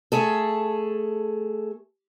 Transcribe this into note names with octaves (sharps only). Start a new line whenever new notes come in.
A3 G#4 A4